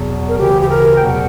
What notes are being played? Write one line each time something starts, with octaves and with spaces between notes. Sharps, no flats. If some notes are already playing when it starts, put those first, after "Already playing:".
Already playing: E2 B2 F#3
A#4
D2 C#3 E3 G4
G4
A#4
G5
E2 B2 F#3 F#5